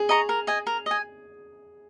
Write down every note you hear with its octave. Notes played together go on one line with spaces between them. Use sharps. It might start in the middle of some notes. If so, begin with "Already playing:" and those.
Already playing: G#4
D#5 A#5 C#6
A#4
D#5 G#5
A#4
D#5 G#5